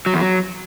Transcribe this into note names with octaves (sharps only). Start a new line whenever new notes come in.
F#3
E2
F#3